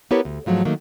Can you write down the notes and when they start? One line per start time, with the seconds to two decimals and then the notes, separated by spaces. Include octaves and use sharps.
0.11 B3 E4 G4 A#4 B4 C#5
0.25 D2
0.46 G#2 F3 F#3 A3
0.65 D#3 F#3 A3 A#3